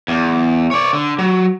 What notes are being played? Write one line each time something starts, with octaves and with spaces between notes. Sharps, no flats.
E2
C#5 D5
D3
F#3